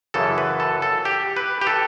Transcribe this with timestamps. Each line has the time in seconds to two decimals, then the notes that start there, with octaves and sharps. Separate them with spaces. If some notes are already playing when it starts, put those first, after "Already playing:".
0.14 F#2 C#3 E3 A4
0.38 B4
0.60 A4
0.82 A4
1.05 G4
1.37 B4
1.61 G4
1.67 A4